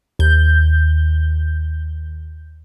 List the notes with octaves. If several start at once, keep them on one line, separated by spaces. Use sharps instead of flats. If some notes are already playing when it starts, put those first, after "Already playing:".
D#2 G6